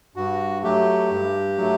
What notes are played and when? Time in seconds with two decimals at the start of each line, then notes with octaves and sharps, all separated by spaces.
0.16 G2 F#4
0.63 F#3 A3 G4
1.10 G2
1.57 F#3 A3